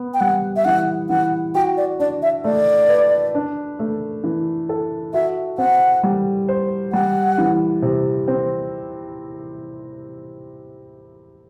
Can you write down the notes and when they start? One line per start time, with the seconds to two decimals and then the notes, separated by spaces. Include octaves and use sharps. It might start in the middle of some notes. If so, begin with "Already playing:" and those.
Already playing: B3
0.14 G5
0.20 G3 F#5
0.56 E5
0.65 E3 F#5
1.09 E3 F#5
1.55 F#4 G5
1.77 D5
1.99 D4 D5
2.22 E5
2.44 A3 D5
2.89 B4
3.35 D4
3.79 A3
4.24 E3
4.69 A4
5.14 F#4 E5
5.58 C4 F#5
6.03 G3
6.48 C5
6.93 G3 F#5
7.38 E3
7.82 C3
8.28 C4